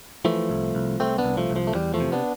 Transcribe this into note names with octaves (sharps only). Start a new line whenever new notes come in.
E3 F3 A3
C2
C2
C2 A3 C4
B3 D4
C2
F3 A3
C2
F3
A3
E2 G3
F3 A3
C3
B3 D4